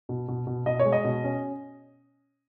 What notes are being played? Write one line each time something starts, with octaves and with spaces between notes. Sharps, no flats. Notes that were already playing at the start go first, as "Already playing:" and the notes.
B2
B2
B2
B2 D#5
C#5
G#3
D#5
B2
C#4